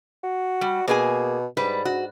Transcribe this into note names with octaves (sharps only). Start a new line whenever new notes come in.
F#4
G3
B2 A#3 G#4 G#5
G#2 G3 B4
F#4